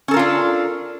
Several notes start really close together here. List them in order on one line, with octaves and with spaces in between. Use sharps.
C#4 A4 A#4 F4 D4